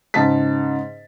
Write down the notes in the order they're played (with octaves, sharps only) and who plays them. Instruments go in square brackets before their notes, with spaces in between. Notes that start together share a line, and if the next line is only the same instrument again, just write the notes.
[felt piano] G#2 C#3 A5 A6 B6